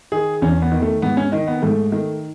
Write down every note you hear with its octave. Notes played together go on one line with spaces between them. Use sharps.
D#3 G#4
E2 C#4
B3
D#3
A3
G#2 B3
C#4
D#3 D#4
B3
G#2 A3
D#3 A3